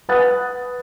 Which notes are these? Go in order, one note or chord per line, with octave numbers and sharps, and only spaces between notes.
B4 F#5 B5 D#6 F#6 A6